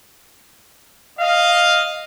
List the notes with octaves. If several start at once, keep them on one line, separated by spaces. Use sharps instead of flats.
D#5 F5